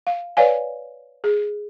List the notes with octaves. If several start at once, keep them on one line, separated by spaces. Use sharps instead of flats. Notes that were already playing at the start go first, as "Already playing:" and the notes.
F5
B4 C#5 D5 F5 G#5
G#4